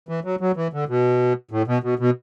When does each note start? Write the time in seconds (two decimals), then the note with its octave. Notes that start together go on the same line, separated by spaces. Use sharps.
0.09 E3
0.25 F#3
0.41 F#3
0.57 E3
0.73 D3
0.89 B2
1.51 A2
1.67 B2
1.83 B2
1.99 B2